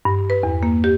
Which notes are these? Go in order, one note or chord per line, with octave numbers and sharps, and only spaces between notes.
G2
B4
E2
A#3
G4